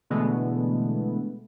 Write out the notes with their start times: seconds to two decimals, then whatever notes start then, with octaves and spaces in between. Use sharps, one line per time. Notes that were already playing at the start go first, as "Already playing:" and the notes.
0.10 B2 D3 E3 G#3 A3 B3